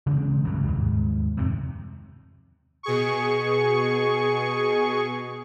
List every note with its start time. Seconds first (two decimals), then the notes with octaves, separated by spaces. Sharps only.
0.06 C#3 E3 G#3 C4
0.44 E1 C2 G2 F#3
0.67 D#2 G#2
1.37 F2 C3 D#3
2.83 B2 G#4 C#6